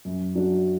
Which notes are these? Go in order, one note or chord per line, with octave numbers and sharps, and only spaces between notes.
F#2
F#3 D4 F#4